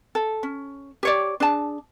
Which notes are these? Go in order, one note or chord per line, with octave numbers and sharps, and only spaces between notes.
A4
C#4
G4 C#5 D5
D4 G#4 A5